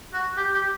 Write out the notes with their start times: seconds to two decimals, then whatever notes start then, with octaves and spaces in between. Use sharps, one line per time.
0.13 F#4
0.37 G4
0.54 G4